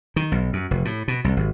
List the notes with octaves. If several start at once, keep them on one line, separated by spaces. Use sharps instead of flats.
D#3
B1
F#2
F1
A2
B2
C2
G#1